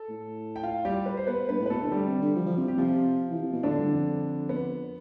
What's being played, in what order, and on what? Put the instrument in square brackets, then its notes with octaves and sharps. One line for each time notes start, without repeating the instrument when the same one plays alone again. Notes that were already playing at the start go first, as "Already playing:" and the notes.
Already playing: [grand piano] A4
[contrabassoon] A2
[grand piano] G5
F4 F5
G3 G4
B4
C5
B3 B4
[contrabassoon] G2 [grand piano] B3 B4
[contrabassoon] A2
[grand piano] B4
[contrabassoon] B2 [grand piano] A3 A4
[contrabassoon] D3
[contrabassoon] D3 [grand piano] G3 G4
[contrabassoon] C3
D3
F3
F3
C3
[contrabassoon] C3 [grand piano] G4
[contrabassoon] C3 [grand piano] F3 F4
[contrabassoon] E3
C3
B2
[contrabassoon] A2 [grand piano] D3 D4
[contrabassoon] G2
F2
[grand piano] B3